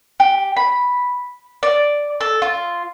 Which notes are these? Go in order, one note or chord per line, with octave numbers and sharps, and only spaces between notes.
G4
B5
D5
A4
F4